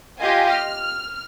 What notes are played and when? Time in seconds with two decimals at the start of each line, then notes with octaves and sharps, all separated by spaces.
0.19 F4 G4 D#5 F5 G#5
0.49 F6